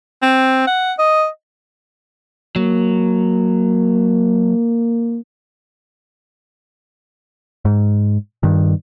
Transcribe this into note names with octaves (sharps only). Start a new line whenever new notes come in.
C4
F#5
D#5
F#3 A#3
G#2
G2 D#3